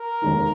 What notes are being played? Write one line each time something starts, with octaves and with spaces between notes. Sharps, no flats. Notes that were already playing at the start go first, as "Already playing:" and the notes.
Already playing: A#4
F1 D#2 D#3 G#3 D#4